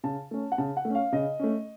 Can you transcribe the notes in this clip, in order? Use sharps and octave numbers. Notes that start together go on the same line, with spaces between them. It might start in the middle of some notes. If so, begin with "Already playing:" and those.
C#3 A5
A3 C#4
F#5
C#3 A5
F#5
A3
C#4
F5
C#3 D#5
A3 C#4